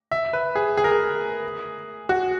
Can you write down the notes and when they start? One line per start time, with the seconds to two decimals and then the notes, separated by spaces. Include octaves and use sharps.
0.11 E5
0.33 B4
0.55 G#4
0.77 G#4
0.84 A#4
0.91 G#4
2.09 F#4